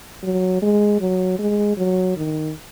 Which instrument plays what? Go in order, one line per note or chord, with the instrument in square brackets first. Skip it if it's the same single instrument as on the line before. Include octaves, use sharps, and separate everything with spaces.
[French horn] F#3
G#3
F#3
G#3
F#3
D#3